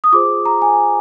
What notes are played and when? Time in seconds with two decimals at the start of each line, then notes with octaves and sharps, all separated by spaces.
0.04 D#6
0.12 F4 G#4 C5 D6
0.45 A#5
0.62 G#5